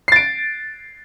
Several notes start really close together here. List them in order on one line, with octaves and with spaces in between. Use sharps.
C7 A6 D7